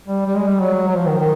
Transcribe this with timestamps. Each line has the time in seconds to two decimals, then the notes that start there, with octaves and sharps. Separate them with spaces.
0.08 G3
0.26 G3
0.36 G#3
0.47 G3
0.60 F#3
0.88 F#3
0.96 F3
1.07 D#3
1.19 D#3